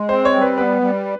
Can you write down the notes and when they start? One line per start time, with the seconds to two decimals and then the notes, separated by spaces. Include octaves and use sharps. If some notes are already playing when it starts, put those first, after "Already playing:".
Already playing: G#3
0.09 C4 C5
0.25 C#5
0.34 G3
0.41 B4
0.58 B3 B4
0.82 G3